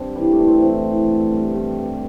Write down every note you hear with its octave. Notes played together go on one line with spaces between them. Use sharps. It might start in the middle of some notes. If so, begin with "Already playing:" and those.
Already playing: G2 C4 D4
E3 G3
A3
E3
C4
A2 C4
E3
D3
G2
G2 G4
G2